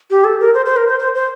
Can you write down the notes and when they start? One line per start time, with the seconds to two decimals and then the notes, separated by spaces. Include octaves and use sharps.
0.10 G4
0.24 A4
0.40 A#4
0.54 C5
0.65 C5
0.76 A#4
0.88 C5
0.99 C5
1.15 C5